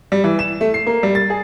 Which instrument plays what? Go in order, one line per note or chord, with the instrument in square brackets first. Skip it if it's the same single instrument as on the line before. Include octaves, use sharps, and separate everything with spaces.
[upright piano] G3
E3
E7
A3
C7
A#3
G3
A6
G#4